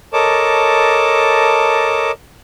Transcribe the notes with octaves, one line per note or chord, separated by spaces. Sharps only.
A4 A#4 C#5 D#5 A5 D6